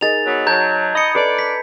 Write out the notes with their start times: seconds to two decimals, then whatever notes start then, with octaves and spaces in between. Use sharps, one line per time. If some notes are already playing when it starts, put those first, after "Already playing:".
0.01 D#4 G#4 A#4 A6 F7
0.25 F#3 B3
0.47 F#3 C#5 A5 A#5 G6 G#6
0.95 D#5 B5 C#7
1.15 D4 A4 B4 D5
1.39 B6